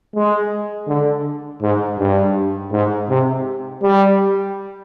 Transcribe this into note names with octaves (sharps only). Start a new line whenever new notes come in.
G#3
D3
G#2
G2
G#2
C3
G3